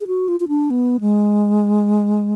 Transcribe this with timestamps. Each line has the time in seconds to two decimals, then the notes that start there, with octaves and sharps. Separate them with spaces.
0.01 G#4
0.07 F#4
0.28 F4
0.40 F4
0.48 D4
0.70 B3
1.01 G#3